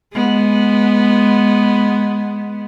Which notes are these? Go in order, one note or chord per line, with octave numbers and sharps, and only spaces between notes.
G#3 B3